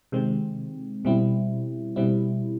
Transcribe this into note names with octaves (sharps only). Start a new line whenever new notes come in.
C3 D#3 G#3 C4
B2 G3 C4 E4
B2 G3 C4 E4